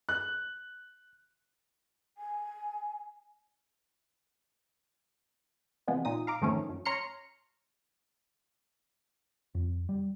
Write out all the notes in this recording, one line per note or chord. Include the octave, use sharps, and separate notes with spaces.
F#6
G#5
C3 E3 F3 G#3 B3
A#2 D#4 D#6
F5 A#5 D6
F2 G#2 D#3 F3 A3 C#4
F#2
C#5 A#5 C6 F6 C#7
F2
G3